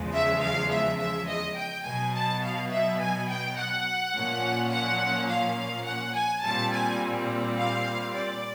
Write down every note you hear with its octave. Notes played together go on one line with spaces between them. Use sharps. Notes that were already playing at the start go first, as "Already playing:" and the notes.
Already playing: E2 C#3 F3 G#3
E5
F5
E5
E5
D#5
G5
B2 F#3 B3 G#5
A5
F5
E5
G#5
G5
F#5
A#2 F3 A#3 C#4
F#5
F5
F#5
G#5
A#2 G3 C4 A5
G#5
F5
D5